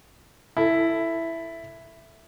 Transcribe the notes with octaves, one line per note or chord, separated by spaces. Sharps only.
E4 A4